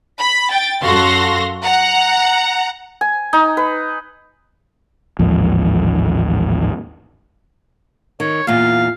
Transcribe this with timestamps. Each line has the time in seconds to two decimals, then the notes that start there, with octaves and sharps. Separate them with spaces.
0.21 B5 B6
0.50 G5 A6
0.83 F#2 F#4 A4 F5 C6 A#6
1.63 F#5 A#5
3.01 G#5
3.33 D#4
3.57 B4
5.19 A1 D#2 G#2 F3
8.20 D#3 C#5
8.47 E2 A#2 F5